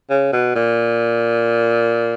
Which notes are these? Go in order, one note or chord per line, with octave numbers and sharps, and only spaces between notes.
C#3
B2
A#2